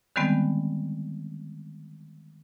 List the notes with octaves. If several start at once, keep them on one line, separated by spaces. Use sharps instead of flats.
D3 D#3 G3 G#3 B3 C4